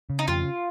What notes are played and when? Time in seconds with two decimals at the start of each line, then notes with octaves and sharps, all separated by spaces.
0.10 C#3
0.19 D#4
0.28 F2 F4